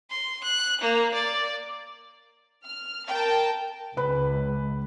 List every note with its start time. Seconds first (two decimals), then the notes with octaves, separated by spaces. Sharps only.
0.10 C6
0.43 F#6
0.81 A#3
1.13 D5
2.65 F6
3.09 A#4 G5 A5
3.97 C#2 B4 B5